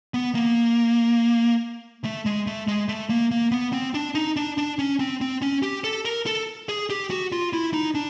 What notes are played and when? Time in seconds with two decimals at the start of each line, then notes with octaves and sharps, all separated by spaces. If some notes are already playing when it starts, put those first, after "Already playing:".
0.14 B3
0.35 A#3
2.04 A3
2.26 G#3
2.47 A3
2.68 G#3
2.89 A3
3.10 A#3
3.31 A#3
3.51 B3
3.73 C4
3.94 D4
4.15 D#4
4.36 D4
4.58 D4
4.79 C#4
4.99 C4
5.21 C4
5.42 C#4
5.63 G4
5.84 A4
6.05 A#4
6.26 A4
6.69 G#4
6.90 G4
7.10 F#4
7.32 F4
7.53 E4
7.73 D#4
7.95 D4